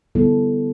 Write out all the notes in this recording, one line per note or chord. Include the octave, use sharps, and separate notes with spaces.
D3 G3 B3 E4 A4